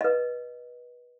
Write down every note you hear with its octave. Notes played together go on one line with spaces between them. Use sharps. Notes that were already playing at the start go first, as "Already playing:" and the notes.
B4 D#5